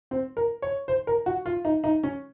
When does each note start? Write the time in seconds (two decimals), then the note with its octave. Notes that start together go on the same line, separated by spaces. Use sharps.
0.11 C4
0.37 A#4
0.62 C#5
0.88 C5
1.07 A#4
1.26 F#4
1.46 F4
1.65 D#4
1.84 D#4
2.03 C#4